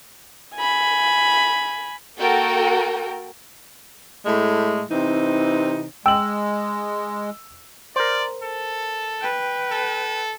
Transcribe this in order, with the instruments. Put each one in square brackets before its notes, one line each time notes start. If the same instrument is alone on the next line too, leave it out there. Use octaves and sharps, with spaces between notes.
[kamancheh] G#5 B5
[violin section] A#3 F#4 A4 A#4 G5
[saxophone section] A2 G#3 A3
C3 E3 C4 D#4
[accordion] G#3 [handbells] G5 [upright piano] E6 F#7
[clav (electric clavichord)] A#4 C5 [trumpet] D5
[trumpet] A4
[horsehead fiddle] B4 G5
[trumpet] A4